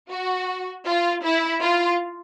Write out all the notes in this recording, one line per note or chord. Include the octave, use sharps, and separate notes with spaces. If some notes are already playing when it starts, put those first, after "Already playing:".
F#4
F4
E4
F4